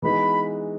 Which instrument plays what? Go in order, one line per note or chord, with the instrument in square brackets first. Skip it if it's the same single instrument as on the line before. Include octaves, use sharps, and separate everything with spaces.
[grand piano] E3 G#3 B3 D#4 F#4 [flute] B5